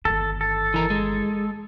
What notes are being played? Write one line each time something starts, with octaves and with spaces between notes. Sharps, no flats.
G1 D#3 A4
A4
E3 A#4
G#3